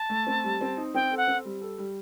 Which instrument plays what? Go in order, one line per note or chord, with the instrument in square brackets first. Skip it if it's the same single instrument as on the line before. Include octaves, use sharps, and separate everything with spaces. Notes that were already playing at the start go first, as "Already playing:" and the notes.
Already playing: [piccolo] A5
[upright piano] A3
C4
G3
C4
D#4
[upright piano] C4 [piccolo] G5
[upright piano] A4
[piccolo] F#5
[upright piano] C4
G3
A4
G3